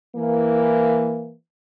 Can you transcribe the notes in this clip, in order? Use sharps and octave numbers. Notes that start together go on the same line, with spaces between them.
E3 A#3